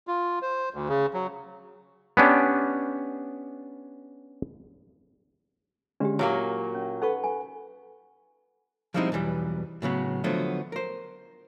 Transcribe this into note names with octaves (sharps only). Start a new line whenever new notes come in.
F4
C5
D2
C#3
F#3
B3 C#4 D4 G4
D3 G#3 C#4 D4 G4
A#2 F#3 A#3 E4 C#5
C#4
D#4 A4 B4 F#5 C#6
G#5
F3 G3 G#3 C4 D#4 E4
B1 E2 E3 G3
A2 C#3 F#3 B3
D3 F3 F#3 A3 B3
A#4 C5